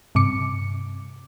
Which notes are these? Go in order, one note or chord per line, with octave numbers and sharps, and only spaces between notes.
G2 C3 D6 C#7